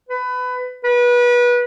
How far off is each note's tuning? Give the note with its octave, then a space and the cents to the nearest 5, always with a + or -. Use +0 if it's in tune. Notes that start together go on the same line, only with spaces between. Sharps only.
B4 +20
B4 -25